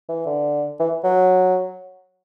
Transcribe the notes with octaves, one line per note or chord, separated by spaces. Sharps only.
E3
D3
E3
F#3